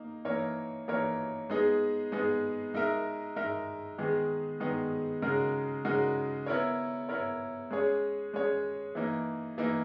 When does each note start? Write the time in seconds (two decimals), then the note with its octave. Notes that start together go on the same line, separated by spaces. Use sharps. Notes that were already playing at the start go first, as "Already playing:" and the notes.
Already playing: A#3 D#4
0.25 E3 A#3 D#4 A#4 C#5
0.88 E3 A#3 D#4 A#4 C#5
1.50 G#3 B3 D#4 G#4
2.12 G#3 B3 D#4 G#4
2.74 G#3 D#4 A#4 E5
3.36 G#3 D#4 A#4 E5
3.98 D#3 G#3 B3 D#4 G#4
4.60 D#3 G#3 B3 D#4 G#4
5.22 C#3 G#3 D#4 F#4 A#4
5.84 C#3 G#3 D#4 F#4 A#4
6.46 B3 E4 A#4 C#5
7.09 B3 E4 A#4 C#5
7.71 G#3 C#4 G#4 C#5
8.34 G#3 C#4 G#4 C#5
8.95 E3 A#3 D#4
9.58 E3 A#3 D#4